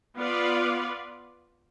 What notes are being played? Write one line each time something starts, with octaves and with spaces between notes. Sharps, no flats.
B3 F4 B4 D5 F5